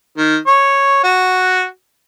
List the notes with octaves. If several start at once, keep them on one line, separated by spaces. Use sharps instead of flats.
D#3
C#5
F#4